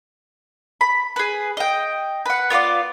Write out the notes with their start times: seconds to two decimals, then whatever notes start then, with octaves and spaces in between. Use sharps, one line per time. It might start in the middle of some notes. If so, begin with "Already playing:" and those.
0.81 B5
1.16 G#4 B4
1.57 D#5 G5
2.26 B4 F#5
2.50 B3 F4 A4 D5